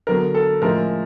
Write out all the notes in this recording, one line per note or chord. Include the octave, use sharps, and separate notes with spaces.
D3 F#3 B3 A#4
A4
A2 F3 G#3 C#4 A#4